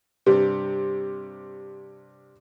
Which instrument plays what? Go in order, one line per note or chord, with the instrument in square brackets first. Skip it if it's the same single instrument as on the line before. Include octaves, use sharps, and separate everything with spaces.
[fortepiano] G2 C3